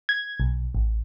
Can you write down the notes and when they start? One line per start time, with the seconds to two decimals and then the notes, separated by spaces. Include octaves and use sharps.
0.09 G#6
0.40 B1
0.75 A1